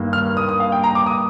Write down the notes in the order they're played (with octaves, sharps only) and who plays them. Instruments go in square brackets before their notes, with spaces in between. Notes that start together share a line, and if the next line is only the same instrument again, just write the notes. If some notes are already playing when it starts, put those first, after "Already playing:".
Already playing: [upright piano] G2 D#3 A#3
[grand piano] F6
D#6
D#6
F5
G5
A#5
D6
D#6